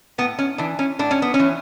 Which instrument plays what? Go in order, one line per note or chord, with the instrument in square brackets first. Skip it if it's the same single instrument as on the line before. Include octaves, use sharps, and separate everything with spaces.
[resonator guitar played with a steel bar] A2 B3
C#4
E3 D4
C#4
A2 D4
C#4
B3
C#4
E3